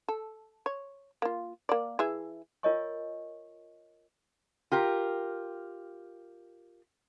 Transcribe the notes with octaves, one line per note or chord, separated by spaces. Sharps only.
A4
C#5
A#3 F4
A#3 D5
E3 G#4 E5
F4 A#4 C#5 D#5 G#5 C#6
F4 G4 A#4